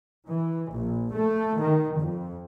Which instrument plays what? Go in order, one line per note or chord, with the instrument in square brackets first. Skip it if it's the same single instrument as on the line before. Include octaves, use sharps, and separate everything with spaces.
[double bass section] E3
A#1
A3
D#3
F2